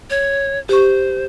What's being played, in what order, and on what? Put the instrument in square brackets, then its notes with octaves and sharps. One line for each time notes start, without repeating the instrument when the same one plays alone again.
[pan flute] C#5
[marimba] G4 C#6 [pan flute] C5